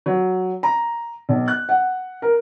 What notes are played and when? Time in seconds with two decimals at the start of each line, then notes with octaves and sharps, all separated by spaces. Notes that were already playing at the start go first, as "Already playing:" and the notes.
0.06 F#3
0.63 A#5
1.29 B1
1.48 F#6
1.69 F#5
2.22 A#4